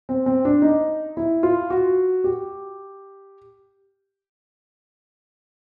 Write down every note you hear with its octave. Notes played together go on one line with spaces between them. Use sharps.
C4
C4
D4
D#4
E4
F4
F#4
G4